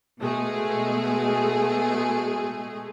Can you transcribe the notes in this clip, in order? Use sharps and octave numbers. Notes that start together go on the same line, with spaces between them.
B2 G#3 A3 G#4